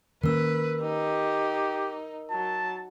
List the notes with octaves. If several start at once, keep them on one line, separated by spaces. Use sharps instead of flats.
D#3 A#3 C#4 A#4 B4 E6
D#4 G4
F#3 A5